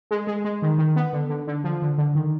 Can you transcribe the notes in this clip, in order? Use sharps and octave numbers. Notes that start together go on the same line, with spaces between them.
G#3
G#3
G#3
D#3
D#3
B3
D3
D3
D3
F3
D3
D3
D#3